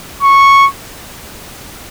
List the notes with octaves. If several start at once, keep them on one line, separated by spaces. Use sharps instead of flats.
C#6